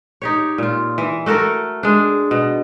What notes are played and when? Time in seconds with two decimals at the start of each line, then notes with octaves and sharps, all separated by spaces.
0.22 D#4 G4 C#5
0.58 A#2 F4
0.98 E3
1.26 A3 F#4 A4 A#4
1.83 G#3 D4
2.31 B2